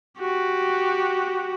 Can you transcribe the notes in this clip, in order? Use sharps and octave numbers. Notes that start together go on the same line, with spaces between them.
F#4 G4